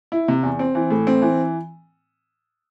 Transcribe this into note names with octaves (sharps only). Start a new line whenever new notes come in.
E4
C3
E2
C4
E3
A2
C4
E3